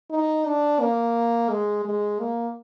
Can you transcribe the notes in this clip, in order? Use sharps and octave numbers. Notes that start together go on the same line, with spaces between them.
D#4
D4
A#3
G#3
G#3
A#3